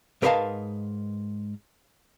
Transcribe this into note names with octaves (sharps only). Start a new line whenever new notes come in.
G#2 A#4 B4 D#5 F5 A5